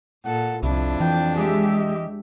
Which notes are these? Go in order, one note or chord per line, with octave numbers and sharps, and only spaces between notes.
A#2 A4 F#5
C2 F2 D4 E4
E3 G5
G#3 G4 G#4 E5
D#5